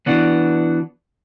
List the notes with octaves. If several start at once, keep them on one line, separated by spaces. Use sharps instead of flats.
E3 B3 D4 F#4